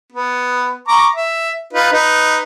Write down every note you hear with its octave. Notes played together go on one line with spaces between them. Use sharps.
B3
A#5 C#6 D6
E5
D#4 F4 B4
D#4 B4